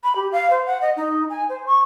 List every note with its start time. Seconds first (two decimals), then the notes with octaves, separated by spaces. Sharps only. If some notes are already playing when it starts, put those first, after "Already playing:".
0.04 B5
0.16 G4
0.32 F5
0.51 C5
0.66 F#5
0.81 D#5
0.97 D#4
1.30 G#5
1.49 C5
1.67 C#6